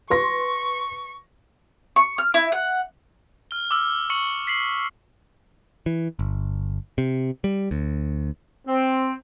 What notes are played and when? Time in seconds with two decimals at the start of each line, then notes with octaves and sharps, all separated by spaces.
0.10 B4 C6 C#6 A#6
1.96 C#6
2.18 F6
2.34 E4
2.52 F#5
3.51 F6 G7
3.71 D6 E6 F6
4.10 C#6 C#7 F#7
4.47 B6 C7 F#7
5.86 E3
6.19 G1
6.98 C3
7.44 G3
7.71 D2
8.67 C4